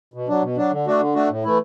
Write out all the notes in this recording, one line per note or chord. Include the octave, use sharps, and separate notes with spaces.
B2
F#3 D4
B2
F#3 D4
D3
A3 D4 F#4
D3
A3 D4 F#4
A2
E3 A3 E4